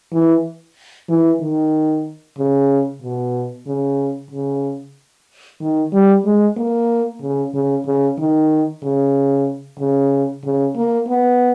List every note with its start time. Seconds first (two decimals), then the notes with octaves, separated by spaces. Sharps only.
0.12 E3
1.09 E3
1.41 D#3
2.38 C#3
3.02 B2
3.67 C#3
4.31 C#3
5.60 D#3
5.92 G3
6.25 G#3
6.57 A#3
7.21 C#3
7.54 C#3
7.86 C#3
8.18 D#3
8.83 C#3
9.79 C#3
10.44 C#3
10.76 A#3
11.08 B3